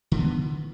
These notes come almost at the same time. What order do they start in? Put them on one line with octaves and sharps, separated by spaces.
D3 F#3 E3 B3